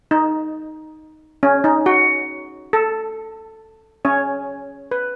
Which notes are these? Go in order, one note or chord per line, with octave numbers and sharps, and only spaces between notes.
D#4
C#4
D#4
F#4
A4
C#4 C#5
B4